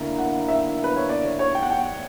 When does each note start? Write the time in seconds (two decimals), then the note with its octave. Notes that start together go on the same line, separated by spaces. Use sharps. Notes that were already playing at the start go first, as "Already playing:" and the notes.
Already playing: D3 A#3 E4 A#5
0.18 F#5
0.48 E5
0.84 B4
0.96 C#5
1.09 D5
1.24 C#5
1.39 C#5
1.55 G5
1.63 F#5
1.71 G5